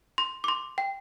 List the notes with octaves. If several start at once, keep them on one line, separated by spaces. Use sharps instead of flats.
C6
D6
C6
G5